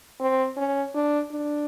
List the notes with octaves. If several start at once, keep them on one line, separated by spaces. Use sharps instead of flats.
C4
C#4
D4
D4